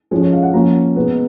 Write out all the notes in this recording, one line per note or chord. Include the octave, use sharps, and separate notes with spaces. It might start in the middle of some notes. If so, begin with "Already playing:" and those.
F3 G#3 C#4 C#5
C#5
F5
F#5
F3 A#3 C#4 A#5
B2 G#3 B3